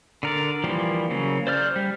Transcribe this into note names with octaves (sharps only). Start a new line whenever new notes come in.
D3 A#4 D5
E3 F3 G3 A#3
C#3 F#3 A#3
C5 D5 F6 G6
G3